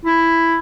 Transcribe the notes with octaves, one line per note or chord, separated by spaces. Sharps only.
E4